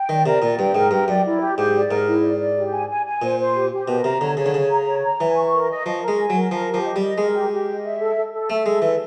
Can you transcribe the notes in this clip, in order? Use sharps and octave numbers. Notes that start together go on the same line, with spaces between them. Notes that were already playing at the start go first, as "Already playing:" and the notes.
Already playing: G5
D#3 D5
C3 A#4
A#2 D5
G2 G5
G#2 A#4
G2 G5
F#2 D5
E4
G4
G#2 G4
D5
G#2 A#4
E4
D5
D5
G4
G#5
G#5
G#5
A#2 C5
C5
G4
G4
B2 A#4
C3 A#5
D3 C#5
C#3 C#5
D3
C#3 C#5
A#5
C#5
A#5
E3 G#5
C#6
A#4
D#5
F3 D#5
A#4
G#3
G#5
F#3 A#4
F3 A#4
G4
F3
D#5
G3
D#5
G#3 A#4
G4
G4
D#5
E5
A4
A4
A4
A3 E5
G#3 A4
E3 A4